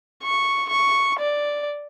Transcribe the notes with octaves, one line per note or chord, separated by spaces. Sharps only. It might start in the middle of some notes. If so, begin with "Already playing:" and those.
C#6
C#6
D5